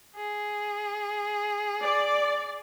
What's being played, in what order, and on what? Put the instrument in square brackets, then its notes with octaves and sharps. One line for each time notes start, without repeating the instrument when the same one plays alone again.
[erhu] G#4
[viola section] D5